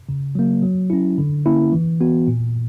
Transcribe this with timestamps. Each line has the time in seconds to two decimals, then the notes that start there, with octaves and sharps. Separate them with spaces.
0.09 C#3
0.35 F#3 A#3
0.63 F#3
0.90 C#4 E4
1.18 D3
1.45 A#3 C#4 E4
1.72 E3
2.01 B3 F#4
2.28 A#2